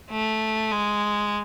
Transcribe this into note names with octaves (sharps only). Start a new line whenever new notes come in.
A3
G#3